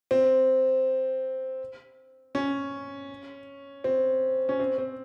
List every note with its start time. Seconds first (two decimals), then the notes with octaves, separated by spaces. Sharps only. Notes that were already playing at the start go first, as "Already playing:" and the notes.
0.11 C4
2.35 C#4
3.84 C4
4.49 C#4
4.60 C4
4.78 C4